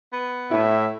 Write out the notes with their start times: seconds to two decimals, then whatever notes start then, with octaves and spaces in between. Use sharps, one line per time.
0.13 B3
0.51 A2 E4 E5